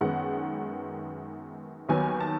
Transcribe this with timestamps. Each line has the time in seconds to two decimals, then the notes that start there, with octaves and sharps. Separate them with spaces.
0.01 F#2 D#3 G#3 B3 F#5
1.89 D#2 D#3 F#3 B3 G#5
2.20 A5